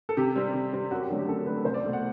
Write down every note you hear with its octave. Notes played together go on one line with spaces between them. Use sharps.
A4
C3 G4
G3 C4
C3
G3 C4
F#2 F#4
G4
D3 F#3 A3 F#4
G4
F#2 A4
A4
D3 F#3 A3 B4
C2 C5
D5
B2 A3
F#5